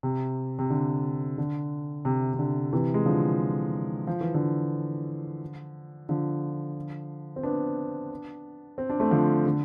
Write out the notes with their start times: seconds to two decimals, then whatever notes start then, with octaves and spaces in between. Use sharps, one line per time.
0.03 C3
0.59 C3
0.70 D3
1.38 D3
2.05 C3
2.34 C3
2.39 D3
2.73 C3 E3
2.94 G#3
3.06 D3 F3
4.07 F3
4.21 E3
4.34 D3 F3
6.09 D3 F3
7.36 C4
7.43 B3 D4
8.78 C4
8.90 D4
9.00 A3 C4
9.11 D3 F3
9.46 D3